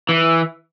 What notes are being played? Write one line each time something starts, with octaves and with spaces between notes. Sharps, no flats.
E3